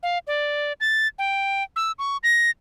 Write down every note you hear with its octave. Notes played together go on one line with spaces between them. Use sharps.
F5
D5
A6
G5
E6
C#6
A#6